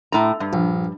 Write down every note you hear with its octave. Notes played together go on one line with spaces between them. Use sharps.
A2 A#5
G2
A#1